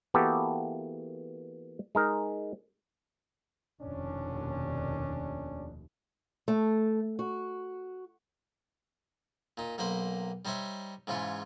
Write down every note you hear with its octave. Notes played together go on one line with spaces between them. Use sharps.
E3 A#3 B3 F#4 G4 A4
G#3 D#4 A#4
F1 D#2 B2 C#4 D4
A3
F#4
A#2 D#4
B1 A#3 D#4 C5 B5
G3 D#4 C5 C#5 E5
G#2 C#3 E3 F4 C#5